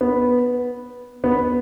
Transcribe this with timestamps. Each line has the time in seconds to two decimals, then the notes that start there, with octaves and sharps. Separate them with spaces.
0.01 B3
1.24 B3